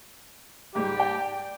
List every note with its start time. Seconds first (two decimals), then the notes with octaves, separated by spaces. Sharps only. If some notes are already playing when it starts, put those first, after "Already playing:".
0.75 G#2 G3 G#3 G4
0.96 D5 G5